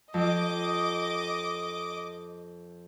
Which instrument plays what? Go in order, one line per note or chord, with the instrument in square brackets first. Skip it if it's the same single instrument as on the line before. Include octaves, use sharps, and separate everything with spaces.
[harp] F2 [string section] D#5 D6